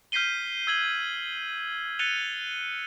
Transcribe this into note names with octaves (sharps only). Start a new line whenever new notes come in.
F6 G6 B6 C7 D#7 G7
E6 G#6 F#7 G7
F#6 A6 C#7 D#7 F7 G7